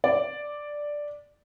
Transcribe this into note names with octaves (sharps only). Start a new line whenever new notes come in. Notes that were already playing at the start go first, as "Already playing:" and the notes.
D5